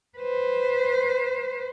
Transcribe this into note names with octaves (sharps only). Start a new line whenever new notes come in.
B4 C5